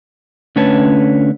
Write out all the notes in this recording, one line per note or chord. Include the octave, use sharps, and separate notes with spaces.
D3 A3 C#4 B4 C#5 A5